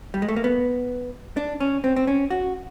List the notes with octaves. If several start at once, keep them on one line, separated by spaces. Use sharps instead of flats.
G3
G#3
A3
A#3
B3
D4
C#4
C4
C4
C#4
F#4